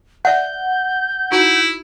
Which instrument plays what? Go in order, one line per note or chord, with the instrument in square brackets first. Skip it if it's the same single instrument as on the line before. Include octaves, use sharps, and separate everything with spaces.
[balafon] D5 E5 [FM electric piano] F#5 [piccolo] G6
[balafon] D#4 F#4 [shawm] E4